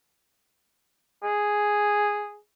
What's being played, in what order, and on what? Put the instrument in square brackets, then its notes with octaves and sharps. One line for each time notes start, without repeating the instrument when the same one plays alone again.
[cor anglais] G#4